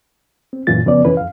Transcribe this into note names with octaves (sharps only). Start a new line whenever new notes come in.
C4
F#2 A#2 E3 F4 A6
F2 C#3 F3 B3 D5
F2 C3 E3 C#4 E4 B4
F2 F5